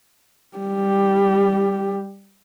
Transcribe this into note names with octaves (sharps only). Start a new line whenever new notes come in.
G3 G4